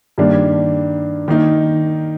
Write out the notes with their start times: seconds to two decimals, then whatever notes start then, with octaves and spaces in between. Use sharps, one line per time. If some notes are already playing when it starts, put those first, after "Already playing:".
0.18 G2 D#3 A#3 D4
1.28 D#3 A#3 D#4